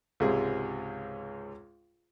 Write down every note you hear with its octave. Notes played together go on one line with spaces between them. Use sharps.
C#2 G#2 C3 G#4